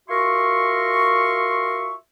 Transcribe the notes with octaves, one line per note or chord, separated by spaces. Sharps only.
F4 F#4 A#4 E5 C6 C#6